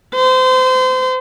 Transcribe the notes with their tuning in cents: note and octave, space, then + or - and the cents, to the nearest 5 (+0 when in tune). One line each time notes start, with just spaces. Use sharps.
C5 -30